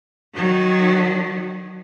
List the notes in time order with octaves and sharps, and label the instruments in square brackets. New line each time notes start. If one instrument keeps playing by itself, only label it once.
[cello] D#3 F#3